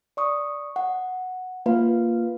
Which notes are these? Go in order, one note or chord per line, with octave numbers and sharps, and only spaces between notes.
D5 C#6 D#6
F#5
A#3 F4 B4 F5